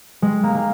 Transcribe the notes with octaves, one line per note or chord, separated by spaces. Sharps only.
G#3
A#3
A#3